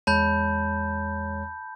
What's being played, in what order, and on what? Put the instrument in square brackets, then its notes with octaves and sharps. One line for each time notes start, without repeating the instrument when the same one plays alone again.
[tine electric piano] E2 G#3 C#5 [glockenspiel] A5 B5 G6